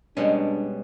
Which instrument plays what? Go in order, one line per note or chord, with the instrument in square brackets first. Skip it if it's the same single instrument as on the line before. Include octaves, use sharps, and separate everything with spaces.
[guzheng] B2 [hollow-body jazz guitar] G3 G#3 C#4 [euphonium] D4